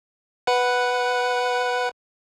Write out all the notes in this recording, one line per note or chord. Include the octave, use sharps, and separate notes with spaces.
B4 F#5